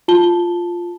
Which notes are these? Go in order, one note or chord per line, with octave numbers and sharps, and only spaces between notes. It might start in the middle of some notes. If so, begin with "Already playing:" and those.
F4 A5 G7